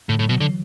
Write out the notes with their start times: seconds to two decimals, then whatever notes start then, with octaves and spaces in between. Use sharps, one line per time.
0.09 A2 D3
0.19 A2 F#3
0.29 B2 F#3
0.40 D3 E3